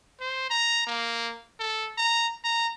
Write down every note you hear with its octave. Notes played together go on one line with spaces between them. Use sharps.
C5
A#5
A#3
A4
A#5
A#5